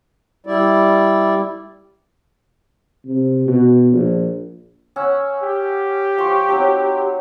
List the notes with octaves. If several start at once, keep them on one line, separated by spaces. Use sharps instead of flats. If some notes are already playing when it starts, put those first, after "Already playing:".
G3 E4 D5
C3
B2
A#1
C#4 F#5 E6
G4
F3 C6 C#6
F#3 C4 D#4